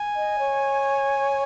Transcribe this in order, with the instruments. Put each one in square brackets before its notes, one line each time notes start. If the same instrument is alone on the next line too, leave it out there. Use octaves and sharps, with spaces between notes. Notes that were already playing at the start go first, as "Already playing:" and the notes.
Already playing: [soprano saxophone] G#5
[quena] D#5
C#5